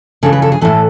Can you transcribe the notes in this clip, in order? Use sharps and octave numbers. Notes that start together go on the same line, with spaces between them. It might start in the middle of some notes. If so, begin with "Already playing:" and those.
C#3 E3 A4
B4
A4
G#4
A2 E3 A4